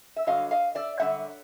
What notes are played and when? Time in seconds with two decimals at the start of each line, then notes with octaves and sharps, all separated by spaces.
0.16 E5
0.27 G2 D3 F#3 D#5 F5
0.51 D#5 F5
0.75 D5 E5
1.00 F#2 D3 G3 E5 F#5